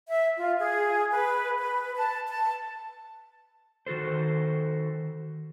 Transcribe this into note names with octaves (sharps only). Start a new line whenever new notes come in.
E5
F4
G#4
B4
B4
A5
A5
D#3 F#4 A4 C5